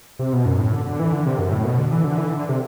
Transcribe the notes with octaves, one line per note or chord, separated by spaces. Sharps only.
C3
B2
F#2
A2
D3
D3
E3
D3
C3
F#2
A2
B2
D3
E3
D3
E3
D3
C3